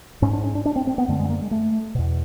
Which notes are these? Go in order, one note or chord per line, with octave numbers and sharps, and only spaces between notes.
G#2 C#4
D4
C#4
D4
D4
C4
C4
B3
F#2 D3 A3
G#3
A#3
G#3
A3
E2 B2